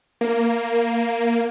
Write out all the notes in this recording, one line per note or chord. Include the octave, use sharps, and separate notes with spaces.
A#3